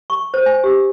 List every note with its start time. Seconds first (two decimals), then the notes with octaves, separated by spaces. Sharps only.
0.10 C#6
0.34 C5
0.46 G#5
0.64 G4